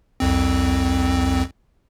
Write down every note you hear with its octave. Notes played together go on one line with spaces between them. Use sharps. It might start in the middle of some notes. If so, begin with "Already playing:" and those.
C2 F2 C4